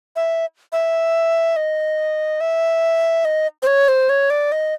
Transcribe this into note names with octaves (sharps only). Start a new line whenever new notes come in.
E5
E5
D#5
E5
D#5
C5
C#5
C5
C#5
D5
D#5